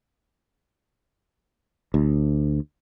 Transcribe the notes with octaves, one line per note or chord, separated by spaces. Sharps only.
D2